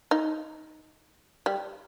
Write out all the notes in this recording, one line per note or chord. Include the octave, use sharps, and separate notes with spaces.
D#4
G3